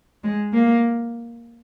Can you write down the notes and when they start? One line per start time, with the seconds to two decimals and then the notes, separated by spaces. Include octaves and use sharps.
0.24 G#3
0.53 A#3